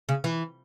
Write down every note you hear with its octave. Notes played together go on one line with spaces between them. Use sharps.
C#3
E3